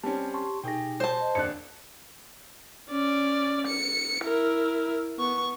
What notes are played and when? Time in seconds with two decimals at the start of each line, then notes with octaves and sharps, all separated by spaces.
0.04 G3 C4 C#4 G4 A5
0.34 A5 C6 C#6
0.64 B2 D#4 G4 G#4 G5 A#6
1.00 C5 A5
1.20 D#5
1.35 D#1 F2 D4 F#6 C#7
2.89 C#4 D5
3.67 C#7
4.23 E4 A#4
5.19 B3 C#6